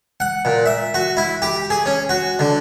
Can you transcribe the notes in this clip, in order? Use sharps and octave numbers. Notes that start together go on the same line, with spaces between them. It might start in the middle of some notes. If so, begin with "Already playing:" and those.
F#5
A#2
E5
F#4
E4
G4
G#4
C#4
F#4
D3